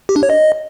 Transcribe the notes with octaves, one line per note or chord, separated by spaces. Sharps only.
G4
D4
C#5
D#5